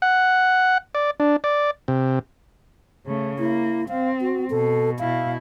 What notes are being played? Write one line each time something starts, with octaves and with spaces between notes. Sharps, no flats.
F#5
D5
D4
D5
C3
C#3 A3
A#3 E4
C4 F5
F#4
B2 A4
B2 E4 F5